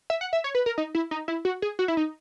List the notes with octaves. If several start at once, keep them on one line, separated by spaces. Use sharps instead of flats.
E5
F#5
E5
C#5
B4
A#4
D#4
E4
D#4
E4
F#4
G#4
F#4
E4
D#4